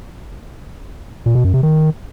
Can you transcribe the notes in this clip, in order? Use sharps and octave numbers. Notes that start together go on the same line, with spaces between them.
A#2
B2
F#2
C3
D#3